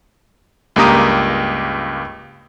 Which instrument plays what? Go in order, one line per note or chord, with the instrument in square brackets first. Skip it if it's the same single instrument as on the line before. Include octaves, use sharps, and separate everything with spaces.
[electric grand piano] C#2 G2 A#3 G4 A#5 D#6